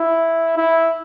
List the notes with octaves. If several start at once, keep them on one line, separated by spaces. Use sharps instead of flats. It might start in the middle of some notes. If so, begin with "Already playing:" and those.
Already playing: E4
E4